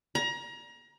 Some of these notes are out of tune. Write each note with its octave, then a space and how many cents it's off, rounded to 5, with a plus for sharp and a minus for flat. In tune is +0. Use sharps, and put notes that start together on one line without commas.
A#5 +30